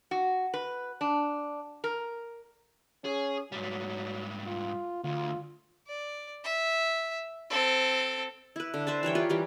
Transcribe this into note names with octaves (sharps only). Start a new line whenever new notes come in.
F#4
B4
D4
A#4
C#4 G#4
G#2 F#3 G3
F4
D2 F4
D5
E5
C4 A4
E4 B4
D3
B4 C5 E5 A5
E3 G3 C#5 G5
F4 G4 A#4 B4
E3 G3 G4